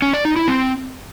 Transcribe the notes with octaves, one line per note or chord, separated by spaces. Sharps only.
C#4
D5
D#4
E4
C4